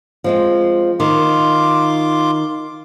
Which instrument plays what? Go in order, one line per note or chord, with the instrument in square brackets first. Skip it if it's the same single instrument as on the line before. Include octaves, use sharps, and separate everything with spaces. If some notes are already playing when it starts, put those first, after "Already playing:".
[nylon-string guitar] F3 G#3 C4
[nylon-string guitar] D#3 [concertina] F4 C6 D6